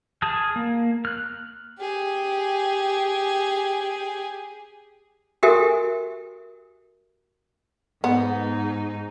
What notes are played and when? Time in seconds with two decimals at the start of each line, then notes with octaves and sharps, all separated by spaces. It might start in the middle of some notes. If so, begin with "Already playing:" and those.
0.22 G#4 A5 D#6 F6
0.56 A#3
1.05 F6 F#6
1.79 G4 G#4
5.43 F#4 G4 A4 A#4 E5 G#5
8.04 G#2 B3 D#4